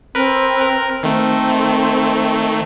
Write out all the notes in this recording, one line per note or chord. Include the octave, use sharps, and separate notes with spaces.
C4 A#4 B4
A#4
D#3 A3 C4